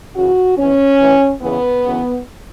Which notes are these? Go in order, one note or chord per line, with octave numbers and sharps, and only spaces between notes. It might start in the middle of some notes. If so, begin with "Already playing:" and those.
F#2 C#3 E3 F#4
E2 E3 C#4
A2 E3
E2 C#3 E3 B3
F#2 C#3 E3